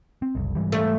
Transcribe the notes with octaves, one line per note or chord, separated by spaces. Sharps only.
C4
F#1 C2
G#2 E3 G3
A3